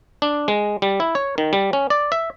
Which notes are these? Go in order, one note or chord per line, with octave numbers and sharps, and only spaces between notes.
D4
G#3
G3
E4
C#5
D#3
G3
C#4
D5
E5